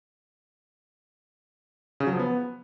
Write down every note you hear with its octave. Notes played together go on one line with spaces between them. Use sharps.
C#3
F#3
F3
B3